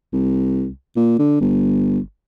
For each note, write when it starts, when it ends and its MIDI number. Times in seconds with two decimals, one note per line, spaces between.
0.13 0.68 36
0.96 1.15 46
1.19 1.36 50
1.40 1.99 31